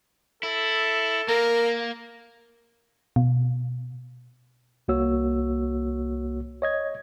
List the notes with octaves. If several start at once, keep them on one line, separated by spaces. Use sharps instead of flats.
E4 A4
A#3 A#4
B2
C2 A#3 F#4 C#5 E6
C#5 D#5 G#6